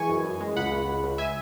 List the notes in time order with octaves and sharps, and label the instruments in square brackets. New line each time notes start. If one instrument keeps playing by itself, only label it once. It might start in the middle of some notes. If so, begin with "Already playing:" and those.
Already playing: [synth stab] E3 G#3 G#5 C#6
F#2
F#2
G#3
C#2 F#5 B5
C#2
C#2
C#2
E5 G#5